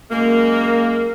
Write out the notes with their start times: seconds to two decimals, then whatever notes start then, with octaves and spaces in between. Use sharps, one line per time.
0.11 F#2 G#3 A#3